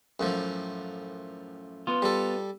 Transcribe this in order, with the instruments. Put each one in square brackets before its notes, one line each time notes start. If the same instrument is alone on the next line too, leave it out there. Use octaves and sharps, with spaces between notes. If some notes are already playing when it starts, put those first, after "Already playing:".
[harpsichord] F#2 A2 F3
[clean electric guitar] B3 F4
[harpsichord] G3 A4